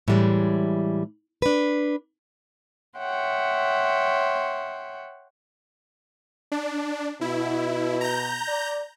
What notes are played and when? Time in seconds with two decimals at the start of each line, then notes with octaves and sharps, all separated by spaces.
0.08 A2 E3 G3 G#3
1.42 D4 B4
2.98 C#5 E5 F#5 G5 C6
6.52 D4
7.21 B2 E4
8.01 A#5 G6
8.47 D5